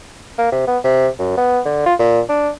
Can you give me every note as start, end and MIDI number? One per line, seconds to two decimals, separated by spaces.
0.38 0.50 58
0.52 0.65 48
0.67 0.78 59
0.84 1.08 48
1.19 1.34 42
1.37 1.60 59
1.65 1.82 50
1.86 1.94 65
1.99 2.20 46
2.29 2.50 62